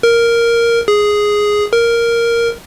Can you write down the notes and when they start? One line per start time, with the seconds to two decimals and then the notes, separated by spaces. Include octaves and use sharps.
0.03 A#4
0.88 G#4
1.73 A#4